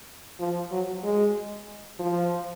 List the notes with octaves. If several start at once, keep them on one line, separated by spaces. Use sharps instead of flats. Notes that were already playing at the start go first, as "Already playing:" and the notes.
F3
F#3
G#3
F3